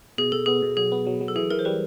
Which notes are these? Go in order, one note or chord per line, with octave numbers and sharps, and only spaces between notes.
B2 G#4
B2 A4
B3 G#4
B2
F#3 G#4
B3
F#3
F#3
A4
E3 G#4
E3 A#4
C5
G3 B4